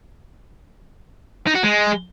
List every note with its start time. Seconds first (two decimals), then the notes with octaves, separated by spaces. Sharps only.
1.47 D#4
1.55 F#4
1.63 G#3